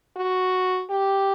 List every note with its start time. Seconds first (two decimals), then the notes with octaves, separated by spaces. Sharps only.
0.17 F#4
0.90 G4